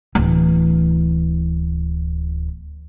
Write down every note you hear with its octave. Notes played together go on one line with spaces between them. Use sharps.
D1 E3